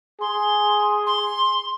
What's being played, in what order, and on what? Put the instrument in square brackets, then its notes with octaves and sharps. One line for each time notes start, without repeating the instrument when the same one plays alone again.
[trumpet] G#4 [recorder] C6
[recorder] C6